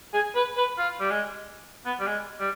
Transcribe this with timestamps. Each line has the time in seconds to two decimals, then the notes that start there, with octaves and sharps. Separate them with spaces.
0.14 G#4
0.35 B4
0.57 B4
0.78 F4
1.00 G3
1.10 G#3
1.85 B3
2.00 G3
2.07 G#3
2.39 G3